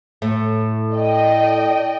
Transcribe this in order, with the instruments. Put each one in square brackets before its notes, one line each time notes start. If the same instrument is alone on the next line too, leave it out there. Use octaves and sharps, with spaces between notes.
[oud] A2
[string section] D5 D#5 G5